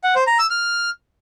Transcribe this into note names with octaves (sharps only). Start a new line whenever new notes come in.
F#5
C5
A#5
E6
F6